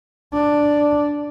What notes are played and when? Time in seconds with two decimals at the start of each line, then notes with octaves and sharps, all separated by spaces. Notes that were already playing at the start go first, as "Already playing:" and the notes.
0.34 D4